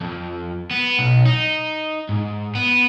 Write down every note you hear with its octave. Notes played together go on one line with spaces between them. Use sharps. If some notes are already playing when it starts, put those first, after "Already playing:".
F2
B3
B1
D#4
G#2
B3